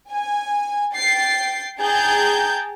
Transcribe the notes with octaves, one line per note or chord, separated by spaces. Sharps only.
G#5
G5 A6 C7
G#4 G5 A5 A#5 G6 G#6